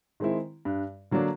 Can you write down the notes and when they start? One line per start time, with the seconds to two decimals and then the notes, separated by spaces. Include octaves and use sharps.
0.20 D#3 G#3 C4 E4
0.65 G2
1.11 D3 F#3 A#3 D4